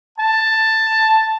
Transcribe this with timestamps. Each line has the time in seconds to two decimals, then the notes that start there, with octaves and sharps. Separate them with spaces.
0.19 A5